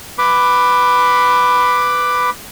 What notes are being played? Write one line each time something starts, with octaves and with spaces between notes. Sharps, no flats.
B4 B5 D6